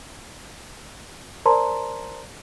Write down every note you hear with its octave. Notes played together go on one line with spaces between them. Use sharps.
A#4 C5 D5 A5 A#5 C6